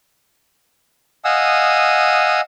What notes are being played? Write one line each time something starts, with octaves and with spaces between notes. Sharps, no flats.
D#5 F5 F#5 G#5 D#6 E6